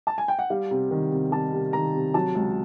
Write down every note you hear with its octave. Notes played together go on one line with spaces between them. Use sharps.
A5
G#5
G5
F#5
G3 F5
C3
D#3
C3
G3 A5
C3
D#3 A#5
C3
F#3 A5
C#2